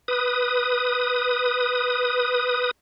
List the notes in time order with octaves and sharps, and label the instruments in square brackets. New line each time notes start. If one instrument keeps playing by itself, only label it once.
[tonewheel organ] B4 D#6